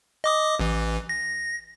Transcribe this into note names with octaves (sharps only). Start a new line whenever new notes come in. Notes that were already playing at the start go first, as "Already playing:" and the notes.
D#5 D6 D#6
A1 E3
A#6